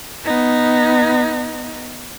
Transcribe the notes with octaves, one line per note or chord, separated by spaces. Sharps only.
B3 D#4